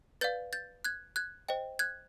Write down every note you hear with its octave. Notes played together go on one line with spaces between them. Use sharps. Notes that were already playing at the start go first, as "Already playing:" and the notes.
B4 D5 F5 G6 A6
G6 A6
F#6 G#6
F#6 G#6
C5 D#5 G5
F#6 G#6